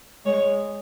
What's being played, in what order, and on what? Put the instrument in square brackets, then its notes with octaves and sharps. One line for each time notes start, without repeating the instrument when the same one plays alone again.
[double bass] G#3 [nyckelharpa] C#5